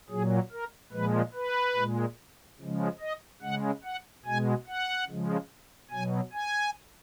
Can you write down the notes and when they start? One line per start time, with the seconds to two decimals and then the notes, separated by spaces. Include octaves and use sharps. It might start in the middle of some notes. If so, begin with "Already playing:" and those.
0.10 A#2 F#3 G#4
0.52 A#4
0.92 A#2 F3 G#3 B4
1.34 B4
1.76 A#2 G#3
2.59 C#3 F3 G#3
3.00 D#5
3.42 C#3 G#3 F#5
3.84 F#5
4.25 B2 G#3 G#5
4.67 F#5
5.08 C#3 F3 G#3
5.91 B2 F#3 G#5
6.33 G#5